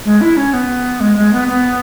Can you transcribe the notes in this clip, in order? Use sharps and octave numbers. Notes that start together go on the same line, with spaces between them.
G#3
E4
C#4
B3
G#3
G#3
B3
B3